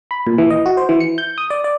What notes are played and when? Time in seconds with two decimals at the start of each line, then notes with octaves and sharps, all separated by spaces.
0.11 B5
0.27 A#2
0.38 E3
0.50 D#5
0.66 F#4
0.77 C5
0.89 E3
1.00 C#7
1.18 G6
1.38 D#6
1.50 D5
1.64 D5